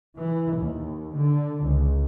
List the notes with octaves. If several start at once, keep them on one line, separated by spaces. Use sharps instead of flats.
E3
D#2
D3
C#2